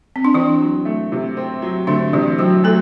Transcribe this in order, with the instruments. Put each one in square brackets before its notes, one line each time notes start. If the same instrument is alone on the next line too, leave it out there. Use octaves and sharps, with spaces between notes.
[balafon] C4
D4
[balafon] E3 E4 [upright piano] C4
[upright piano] F#3
A3
C3
C4
F#3
[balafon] D3 D4 [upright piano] A3
[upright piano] C3 [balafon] E3 E4
[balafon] F#3 F#4 [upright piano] C4
[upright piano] F#3 [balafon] A3 A4